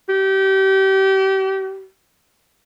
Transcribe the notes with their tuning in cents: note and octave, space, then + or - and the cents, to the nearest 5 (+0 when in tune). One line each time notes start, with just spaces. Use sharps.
G4 -30